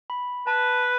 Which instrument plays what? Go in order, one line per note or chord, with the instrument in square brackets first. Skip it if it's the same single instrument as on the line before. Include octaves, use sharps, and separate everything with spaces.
[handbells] B5
[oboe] B4 [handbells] A5